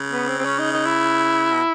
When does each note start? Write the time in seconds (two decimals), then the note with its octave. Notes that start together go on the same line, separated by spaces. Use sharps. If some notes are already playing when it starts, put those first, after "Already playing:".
Already playing: C#3
0.11 B3
0.28 C4
0.39 C4
0.45 C#4
0.59 D#4
0.73 D#4
0.86 E4
1.51 B2